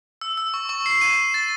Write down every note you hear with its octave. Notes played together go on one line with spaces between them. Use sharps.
E6
E6
C#6
C#6
C7
D#7
C7
A6